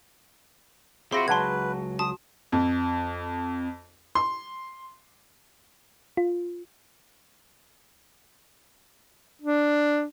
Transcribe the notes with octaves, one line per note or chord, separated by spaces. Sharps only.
C4 F4 F#4 G#4 E5 B5 C6 A#6
C#2 F#3 B4 E5 F#5 A5 C6 G#6
F#4 A5 D#6
F2
C6
F4
D4